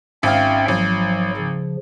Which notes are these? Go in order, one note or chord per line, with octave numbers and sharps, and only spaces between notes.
G#1 C#4 E5 F5 G5
G#1 F3 F#3
C#3 F3